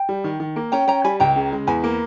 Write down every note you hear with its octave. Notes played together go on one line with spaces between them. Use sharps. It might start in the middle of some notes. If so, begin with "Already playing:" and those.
Already playing: G5
G3
D#3
D#3
A#3
C#4 G5 A#5
C#4 G5 A#5
G3 G#5 B5
C#2 G5 A#5
C#3
G#3
E2 G#5 B5
A#3